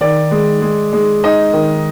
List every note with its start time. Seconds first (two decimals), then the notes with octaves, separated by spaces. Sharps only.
0.01 D#3 D5
0.31 G#3
0.61 G#3
0.93 G#3
1.24 D#4 D#5
1.53 D#3